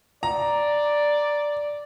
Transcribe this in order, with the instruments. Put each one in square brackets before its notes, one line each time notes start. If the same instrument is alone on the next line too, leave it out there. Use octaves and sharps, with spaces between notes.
[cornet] D5 [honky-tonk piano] A#5